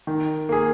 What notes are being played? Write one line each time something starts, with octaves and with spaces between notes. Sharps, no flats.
D#3
A#3 G#4